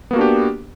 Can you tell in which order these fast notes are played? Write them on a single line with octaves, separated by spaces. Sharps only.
B3 A#3 F#4 D4 G4